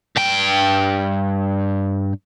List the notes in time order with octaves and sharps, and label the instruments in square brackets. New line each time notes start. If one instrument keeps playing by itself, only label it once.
[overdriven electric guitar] G2 G5